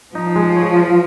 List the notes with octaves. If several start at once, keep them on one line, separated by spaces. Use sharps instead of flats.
F3 D#4
G#3
C#5
F4